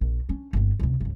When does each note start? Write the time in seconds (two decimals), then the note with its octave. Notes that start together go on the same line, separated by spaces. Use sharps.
0.01 A#1
0.29 C#4 D4
0.53 G1 C4
0.79 C#2 C3
1.00 G1 C#2